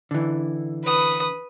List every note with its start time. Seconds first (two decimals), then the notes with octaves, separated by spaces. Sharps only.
0.11 D3 E3
0.84 B4 D#6